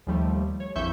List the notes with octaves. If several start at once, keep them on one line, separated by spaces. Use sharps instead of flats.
D#2 F3 G3 A3
C#5
A#1 F2 E3 E5 C#6 G6